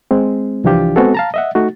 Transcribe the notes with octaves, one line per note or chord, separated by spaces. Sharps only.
G#3 C4
C2 E3 F3 D4 F4 G4
G#3 B3 C4 F#4 G#4 A4
F5 A5 A#5
D#5 E5 F#5
A3 D#4 F#4